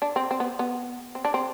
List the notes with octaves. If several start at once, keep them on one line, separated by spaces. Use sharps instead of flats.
D4
C4
C4
B3
B3
C4
D4
C4